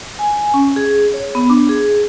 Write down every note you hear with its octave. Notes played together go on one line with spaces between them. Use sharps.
G#5
C#4
G#4
C#5
B3
D4
G#4